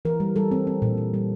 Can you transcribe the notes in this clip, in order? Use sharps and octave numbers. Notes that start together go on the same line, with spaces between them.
E3 A#4
G3
G3 A4
C4
C4
A#2
A#2
G3